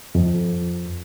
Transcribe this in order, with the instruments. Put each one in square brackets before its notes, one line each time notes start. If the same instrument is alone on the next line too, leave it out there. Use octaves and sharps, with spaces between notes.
[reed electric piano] F2